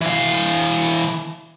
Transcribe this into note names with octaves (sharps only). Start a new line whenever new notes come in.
E3 F5